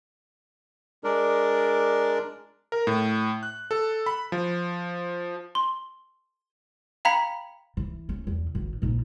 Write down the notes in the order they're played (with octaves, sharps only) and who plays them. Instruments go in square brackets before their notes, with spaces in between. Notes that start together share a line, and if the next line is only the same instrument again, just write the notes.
[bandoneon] G#3 D4 A#4 D5
[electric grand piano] A#4
A2
F#6
A4
B5
F3
[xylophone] C6
F5 G5 A#5 B5 G#6 B6
[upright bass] E3
C#4
E2
G#1
A#1 D#4